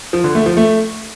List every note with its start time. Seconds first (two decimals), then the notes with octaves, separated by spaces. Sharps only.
0.13 F3
0.24 D3
0.35 A3
0.46 F3
0.57 A3